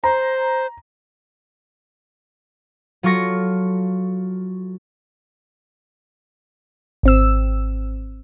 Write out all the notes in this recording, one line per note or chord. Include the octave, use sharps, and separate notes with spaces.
C5 A#5
F#3 F4 A4 C#6 A#6
G#1 C4 E6